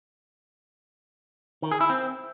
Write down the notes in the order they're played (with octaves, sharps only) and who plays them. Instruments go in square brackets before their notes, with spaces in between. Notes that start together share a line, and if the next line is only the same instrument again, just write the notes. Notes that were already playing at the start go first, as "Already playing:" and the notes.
[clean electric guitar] D#3
G#4
E4
C4